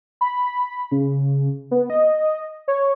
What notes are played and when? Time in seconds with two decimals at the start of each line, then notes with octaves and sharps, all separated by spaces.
0.21 B5
0.47 B5
0.91 C#3
1.71 B3
1.90 D#5
2.68 C#5